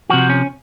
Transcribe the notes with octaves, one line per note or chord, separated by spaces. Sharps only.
C3 F3 F#4
C#4